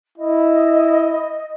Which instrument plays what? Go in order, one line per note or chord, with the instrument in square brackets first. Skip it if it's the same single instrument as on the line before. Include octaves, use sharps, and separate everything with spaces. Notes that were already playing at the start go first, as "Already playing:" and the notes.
[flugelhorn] E4 [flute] D#5